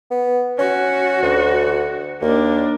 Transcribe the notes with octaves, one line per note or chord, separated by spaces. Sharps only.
B3
C#4 F#4
D2
D#2 A#3 D4